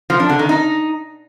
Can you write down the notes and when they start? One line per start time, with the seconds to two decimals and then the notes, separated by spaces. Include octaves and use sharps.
0.10 F3
0.20 D4
0.29 D3
0.39 D#3
0.49 D#4